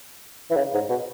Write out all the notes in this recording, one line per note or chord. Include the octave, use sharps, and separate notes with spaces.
E3
C#3
G#2
B2